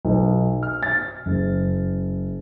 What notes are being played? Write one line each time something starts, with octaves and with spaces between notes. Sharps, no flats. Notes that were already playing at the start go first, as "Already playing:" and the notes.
B1
F6
A6
F#1